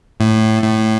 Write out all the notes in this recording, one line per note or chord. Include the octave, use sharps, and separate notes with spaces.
A2
A2